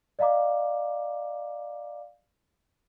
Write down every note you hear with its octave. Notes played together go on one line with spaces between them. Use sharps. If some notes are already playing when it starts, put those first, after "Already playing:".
D5 D#5 F5 A#5 D6